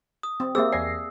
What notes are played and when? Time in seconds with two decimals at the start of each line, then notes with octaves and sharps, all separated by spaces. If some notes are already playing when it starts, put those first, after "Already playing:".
0.23 D#6
0.40 C4
0.55 A#3 C4 G4 G#4 C5 E5 E6
0.72 E2 G#4 D5 A#6 C7